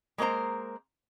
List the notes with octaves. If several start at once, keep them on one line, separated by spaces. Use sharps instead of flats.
G#3 A#3 A#4 C5 A#5